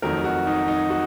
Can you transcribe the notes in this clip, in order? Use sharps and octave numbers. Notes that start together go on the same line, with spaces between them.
F2 D#3 F#3 A3 A#4
F#4
D#4
D#4
F#4